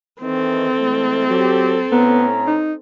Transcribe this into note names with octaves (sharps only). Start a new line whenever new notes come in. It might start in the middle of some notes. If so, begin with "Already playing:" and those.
D#3 E3 C4 A4
E3 G#3 A3
F#3 G4
A2 B3 C#4 A#5
D#4